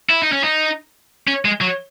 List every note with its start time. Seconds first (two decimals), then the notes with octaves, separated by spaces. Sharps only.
0.10 E4
0.22 D#4
0.33 C#4
0.44 D#4
1.27 C#4
1.45 G#3
1.61 F#3